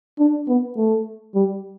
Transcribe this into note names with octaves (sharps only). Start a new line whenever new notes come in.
D4
B3
A3
G3